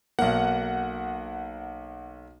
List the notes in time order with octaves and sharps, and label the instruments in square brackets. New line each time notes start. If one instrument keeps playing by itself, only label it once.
[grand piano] B1 A#3 [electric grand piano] F#5